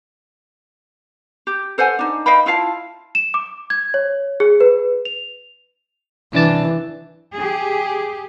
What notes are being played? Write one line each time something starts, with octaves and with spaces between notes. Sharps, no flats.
G4
A4 C5 F#5 G#5
D4 D#4
D#5 F5 G5 B5
E4 F4 F5 A5
E7
D6
G#6
C#5
G#4
B4
F7
C2 E3 D4 A5
G4 G#4